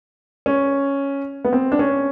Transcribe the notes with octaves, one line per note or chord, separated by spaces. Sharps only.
C#4
B3
C4
D4
C#4